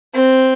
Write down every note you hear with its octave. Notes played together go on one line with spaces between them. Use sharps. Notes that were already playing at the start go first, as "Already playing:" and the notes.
C4